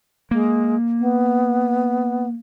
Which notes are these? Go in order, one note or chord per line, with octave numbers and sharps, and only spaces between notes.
G#3 A#3
B3